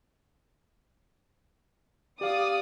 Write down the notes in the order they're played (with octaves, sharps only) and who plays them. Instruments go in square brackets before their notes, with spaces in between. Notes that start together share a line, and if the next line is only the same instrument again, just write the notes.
[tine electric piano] G4 F5 [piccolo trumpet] D5 [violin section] D#6